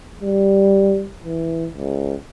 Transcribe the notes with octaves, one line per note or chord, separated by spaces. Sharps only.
G3
E3
C#2